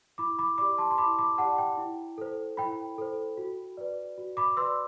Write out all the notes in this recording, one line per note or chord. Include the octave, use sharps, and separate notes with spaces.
E4 B5 D6
B5 D6
G4 D5 B5 D6
A5 C6
C6
E4 B5 D6
B5 D6
G4 D5 F#5 A5
G5
E4
A4 C5
E4 G5 B5
A4 C5
F#4
B4 D5
F#4
B5 D6
B4 D5 C6 E6